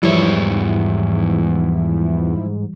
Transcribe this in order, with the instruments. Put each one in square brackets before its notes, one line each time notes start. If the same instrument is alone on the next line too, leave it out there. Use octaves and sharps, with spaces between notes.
[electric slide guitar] E2 C#5 [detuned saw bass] G#2 [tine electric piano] E3 G3 [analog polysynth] F3 E4